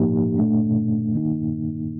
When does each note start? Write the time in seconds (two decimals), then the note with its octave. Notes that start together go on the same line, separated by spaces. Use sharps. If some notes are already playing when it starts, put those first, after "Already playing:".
Already playing: A2 F3 A#3 D#4 G4
0.37 A#2 A3 D4
1.14 D#3 A#3 D#4